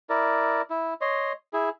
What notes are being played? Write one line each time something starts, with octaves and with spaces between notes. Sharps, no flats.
E4 A#4 D5
E4
C#5 D#5 C6
E4 G#4